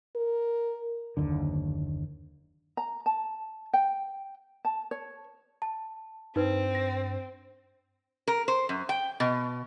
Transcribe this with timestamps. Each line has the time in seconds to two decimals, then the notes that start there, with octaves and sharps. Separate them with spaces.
0.16 A#4
1.17 F#1 D#2 D3
2.77 A#5
3.06 A5
3.73 G5
4.65 A5
4.91 C#5
5.62 A5
6.36 G2 C4 D#4 B4
6.75 A#6
8.27 A#4
8.48 C5
8.69 F#2
8.89 G5
9.20 B2